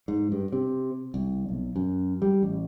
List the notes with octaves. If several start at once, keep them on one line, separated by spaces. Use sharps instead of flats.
G#2
G2
C3
C2
B1
F#2
G3
A1